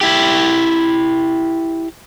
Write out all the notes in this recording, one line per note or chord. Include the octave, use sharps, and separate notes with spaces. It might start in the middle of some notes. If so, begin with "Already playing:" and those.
E4 G4